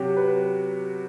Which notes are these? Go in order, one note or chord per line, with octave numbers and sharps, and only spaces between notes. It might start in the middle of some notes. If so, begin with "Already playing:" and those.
Already playing: C3 F#3 F#4 G4
B4